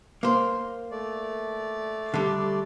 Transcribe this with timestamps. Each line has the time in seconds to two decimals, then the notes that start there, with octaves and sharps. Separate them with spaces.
0.23 A#3 C5
0.91 A3 D5
2.14 D3 G3